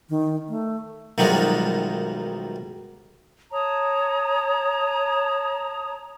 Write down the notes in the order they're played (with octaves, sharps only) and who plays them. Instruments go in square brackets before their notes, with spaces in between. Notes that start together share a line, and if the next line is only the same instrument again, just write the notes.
[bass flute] D#3
A3
[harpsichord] B1 F#2 D#3 F3 G3 G#3
[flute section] C#5 A5 A#5 D#6